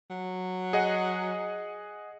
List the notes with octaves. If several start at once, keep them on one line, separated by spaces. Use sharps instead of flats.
F#3
G#4 D#5 F#5